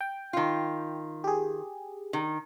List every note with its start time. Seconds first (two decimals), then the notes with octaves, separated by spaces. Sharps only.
0.01 G5
0.33 D#3 F4
1.24 G4 G#4
2.13 D#3